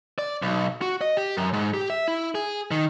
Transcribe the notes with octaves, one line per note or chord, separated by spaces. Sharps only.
D5
B1
F#4
D#5
G4
F#2
G#2
G4
E5
E4
G#4
D#3